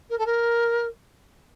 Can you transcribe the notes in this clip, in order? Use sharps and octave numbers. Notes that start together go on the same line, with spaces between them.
A#4
A4
A#4